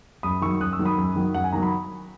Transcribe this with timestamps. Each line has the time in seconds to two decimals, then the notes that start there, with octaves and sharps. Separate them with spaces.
0.23 F#2 B5 D#6
0.41 D#3 F#3 C#6 E6
0.60 F#2 D#6 F#6
0.73 C#6 E6
0.79 D#3 F#3
0.85 B5 D#6
0.98 F#2
1.16 D#3 F#3
1.34 F#2 F#5
1.44 G#5
1.53 D#3 F#3 A#5
1.63 B5